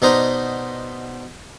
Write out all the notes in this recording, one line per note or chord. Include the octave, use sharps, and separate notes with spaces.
B2 D4 D#4 C5 A#5 D#6